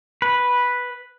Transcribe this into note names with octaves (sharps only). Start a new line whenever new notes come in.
B4